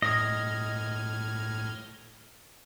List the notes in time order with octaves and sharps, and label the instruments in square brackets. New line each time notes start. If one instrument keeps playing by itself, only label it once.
[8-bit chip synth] A2 F6 G#6 [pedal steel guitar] D#5